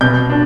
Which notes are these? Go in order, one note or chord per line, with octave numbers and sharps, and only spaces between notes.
B2 G6
D4